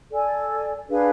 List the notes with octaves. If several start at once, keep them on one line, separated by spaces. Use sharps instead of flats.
A4 D5 G#5
D4 G#4 B4 F5